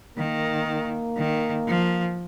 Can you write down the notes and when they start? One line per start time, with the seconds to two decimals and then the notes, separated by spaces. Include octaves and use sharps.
0.17 D#3 A#3
0.67 A#3
1.16 D#3
1.67 F3